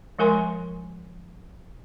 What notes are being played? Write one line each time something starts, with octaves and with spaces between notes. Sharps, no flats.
F3 G#3 A#4 G#5 C6